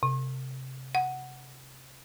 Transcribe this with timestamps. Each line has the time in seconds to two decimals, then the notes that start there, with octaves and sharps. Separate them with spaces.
0.03 C3
0.95 F#5